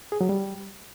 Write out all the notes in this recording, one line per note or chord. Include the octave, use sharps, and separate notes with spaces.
G#4
F#3
G3